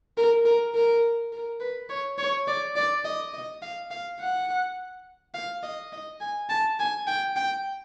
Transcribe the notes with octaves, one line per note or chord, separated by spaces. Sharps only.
A#4
A#4
A#4
A#4
B4
C#5
C#5
D5
D5
D#5
D#5
F5
F5
F#5
F5
D#5
D#5
G#5
A5
G#5
G5
G5